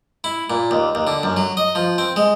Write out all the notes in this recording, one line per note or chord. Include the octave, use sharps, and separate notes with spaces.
E4
A#2
D#2
D#2
D3
F#2
F#3
D#5
F3
C4
G#3